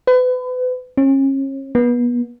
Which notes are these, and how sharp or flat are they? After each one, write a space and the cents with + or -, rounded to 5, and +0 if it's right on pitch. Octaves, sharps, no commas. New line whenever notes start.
B4 +35
C#4 -35
B3 -30